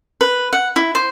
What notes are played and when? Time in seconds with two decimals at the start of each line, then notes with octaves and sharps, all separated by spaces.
0.21 B4
0.53 F#5
0.76 E4
0.95 C5